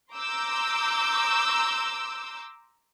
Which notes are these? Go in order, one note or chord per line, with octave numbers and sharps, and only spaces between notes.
A#5 C6 D6 E6 G6